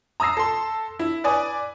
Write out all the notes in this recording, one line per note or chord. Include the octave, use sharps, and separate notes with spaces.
A#5 D#6 E6 A#6 C7
A4 C6
E4
B4 D5 G#5 D#6